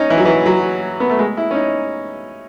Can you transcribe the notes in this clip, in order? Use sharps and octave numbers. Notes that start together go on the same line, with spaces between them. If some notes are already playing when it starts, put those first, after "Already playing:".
Already playing: C#4 D#4
E3
F#3
E3
F#3
B3
A3
G#3
E4
C#4
D#4